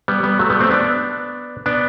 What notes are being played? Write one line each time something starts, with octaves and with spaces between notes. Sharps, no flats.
G3 B3
G3 B3
F#3 A3
G3 B3
A3 C4
B3 D4
B3 D4